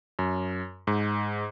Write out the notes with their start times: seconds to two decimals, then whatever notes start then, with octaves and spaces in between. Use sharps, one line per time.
0.19 F#2
0.87 G#2